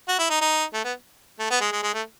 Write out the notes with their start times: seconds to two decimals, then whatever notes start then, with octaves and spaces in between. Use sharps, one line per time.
0.08 F#4
0.19 E4
0.30 D#4
0.41 D#4
0.73 A3
0.84 B3
1.39 A3
1.50 B3
1.61 G#3
1.72 G#3
1.83 G#3
1.94 A3